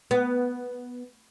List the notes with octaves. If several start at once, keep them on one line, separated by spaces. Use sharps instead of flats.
B3